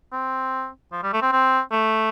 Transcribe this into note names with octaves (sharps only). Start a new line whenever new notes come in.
C4
F3
G3
A3
C4
C4
A3